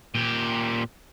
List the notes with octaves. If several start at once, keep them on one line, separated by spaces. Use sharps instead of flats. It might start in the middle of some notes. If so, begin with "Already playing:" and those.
A#2 G4